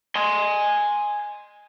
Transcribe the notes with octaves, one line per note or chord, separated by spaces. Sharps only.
G#5 C6